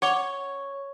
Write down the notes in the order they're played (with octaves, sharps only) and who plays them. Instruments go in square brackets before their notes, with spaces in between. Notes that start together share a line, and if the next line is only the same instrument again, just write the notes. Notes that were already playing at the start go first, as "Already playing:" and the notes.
[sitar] C#5 [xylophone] F#5 D6 G7